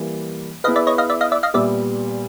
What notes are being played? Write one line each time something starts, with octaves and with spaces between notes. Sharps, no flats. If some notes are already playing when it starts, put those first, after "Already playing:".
Already playing: E3 G3 A#3
B3 E4 G#4 B4 D#5 F5
D5 E5
C#5 D#5
D#5 F5
D5 E5
D#5 F5
D5 E5
D#5 F5
A#2 G3 B3 D5 E5